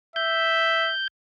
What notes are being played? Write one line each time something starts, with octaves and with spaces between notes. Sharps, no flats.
E5 G6